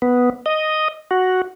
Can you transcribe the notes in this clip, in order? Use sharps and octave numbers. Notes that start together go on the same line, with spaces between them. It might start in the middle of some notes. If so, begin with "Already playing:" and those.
B3
D#5
F#4